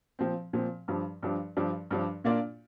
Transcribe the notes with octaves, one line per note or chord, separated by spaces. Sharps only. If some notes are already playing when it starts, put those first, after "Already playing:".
A#2 F3 C4
A#2 F3 C4
G2 F3 D4
G2 F3 D4
G2 F3 D4
G2 F3 D4
A#2 A#3 D4 F4 D5